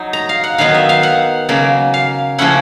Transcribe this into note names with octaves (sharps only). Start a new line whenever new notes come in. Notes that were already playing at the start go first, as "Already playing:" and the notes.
Already playing: F#3 D#4
A#5
F5
F#5
D#3 F#3 B3 D#4 F5
E5
F5
F#5
C#3 F#3 A#3
F5
C#3 F3 A#3 C#4 E4 F#5